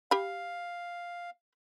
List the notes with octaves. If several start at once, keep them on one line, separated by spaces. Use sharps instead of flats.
G4 F5 B5